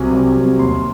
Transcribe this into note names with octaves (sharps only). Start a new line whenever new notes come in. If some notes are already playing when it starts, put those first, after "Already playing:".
Already playing: C2 C3 F#3 G#5
C2
C3 F#3
D#2 C6